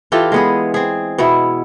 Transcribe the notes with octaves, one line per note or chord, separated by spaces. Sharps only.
E3 F4 G4 A4
G#3 B3 G#4
C4 G#4
B2 B3 E4